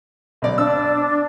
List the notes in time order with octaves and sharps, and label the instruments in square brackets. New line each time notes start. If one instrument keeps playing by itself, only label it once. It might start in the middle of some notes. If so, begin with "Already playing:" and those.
[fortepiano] B1 D5
[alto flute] D4 [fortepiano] E6